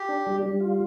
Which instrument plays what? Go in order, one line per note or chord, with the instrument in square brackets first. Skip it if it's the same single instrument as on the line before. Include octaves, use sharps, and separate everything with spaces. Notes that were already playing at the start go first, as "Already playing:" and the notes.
Already playing: [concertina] G4
[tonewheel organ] D4
G3
G3
F4